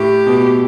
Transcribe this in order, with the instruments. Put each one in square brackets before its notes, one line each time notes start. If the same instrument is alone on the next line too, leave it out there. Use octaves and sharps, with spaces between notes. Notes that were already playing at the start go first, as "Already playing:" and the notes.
Already playing: [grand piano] A2 [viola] G4
[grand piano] B2